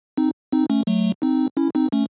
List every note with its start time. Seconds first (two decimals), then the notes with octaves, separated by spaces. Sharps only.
0.17 C4 D#4
0.52 C4 D#4
0.70 A3 C#4
0.87 F#3 A3
1.22 C4 D#4
1.57 C#4 E4
1.75 C4 D#4
1.92 A3 C#4